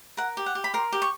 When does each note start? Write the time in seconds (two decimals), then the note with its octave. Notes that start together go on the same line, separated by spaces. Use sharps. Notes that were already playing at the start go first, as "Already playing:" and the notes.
0.17 A#4 F#5
0.37 G4
0.46 F#5
0.55 G4
0.64 B5
0.74 A#4 C6
0.92 G4
1.02 C#6